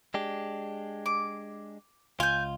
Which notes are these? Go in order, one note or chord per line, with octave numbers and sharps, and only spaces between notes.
G#3 D4 G4
D6
C#2 F4 G#5 G6